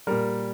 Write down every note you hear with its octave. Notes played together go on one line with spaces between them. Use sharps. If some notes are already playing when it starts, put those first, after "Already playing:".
A#2 G3 A#4